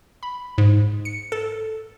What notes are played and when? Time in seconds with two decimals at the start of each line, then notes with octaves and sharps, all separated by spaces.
0.23 B5
0.58 G#2
1.05 C#7
1.32 A4